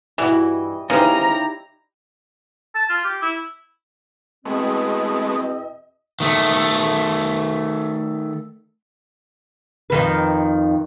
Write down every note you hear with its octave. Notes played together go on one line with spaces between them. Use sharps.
G2 E3 G3 E4 F#4 D#5
C#3 C#4 D#4 E4 G4 B4 C5 A#5
A5
F4
G4
E4
E2 B2 G#3 A3 B3 C4 D#5
D#3 A3
F2 D#3 B4